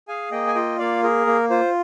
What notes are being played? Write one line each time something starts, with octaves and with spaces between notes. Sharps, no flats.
G#4 F5 G#5
A#3 D#5 G5
G#5
F4 D#5 G5
A#3 D5 F5
G#4 A#4
A#3
F4 C5